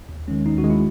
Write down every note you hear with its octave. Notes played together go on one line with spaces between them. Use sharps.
D#2
D#3 G#3 C#4
D#2 D#4
F#4
D#3 G#3
E4